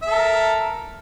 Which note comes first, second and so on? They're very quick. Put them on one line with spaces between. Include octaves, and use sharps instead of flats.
E5 A4 A#4